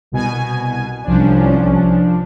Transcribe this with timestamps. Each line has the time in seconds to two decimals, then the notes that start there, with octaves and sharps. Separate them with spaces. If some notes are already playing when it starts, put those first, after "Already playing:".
0.12 C2 B2 G#5
1.04 C2 F3 C#4 D4